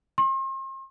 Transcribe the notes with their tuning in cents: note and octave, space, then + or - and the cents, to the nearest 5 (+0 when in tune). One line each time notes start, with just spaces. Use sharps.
C6 +40